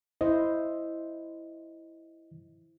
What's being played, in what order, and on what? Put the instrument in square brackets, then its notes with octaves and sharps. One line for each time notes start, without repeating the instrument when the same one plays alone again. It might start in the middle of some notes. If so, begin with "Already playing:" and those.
[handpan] E4 C5 [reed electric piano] D#5